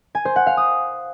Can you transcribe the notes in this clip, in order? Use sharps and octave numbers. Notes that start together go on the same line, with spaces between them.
G#5
C5
F#5
F5
D#6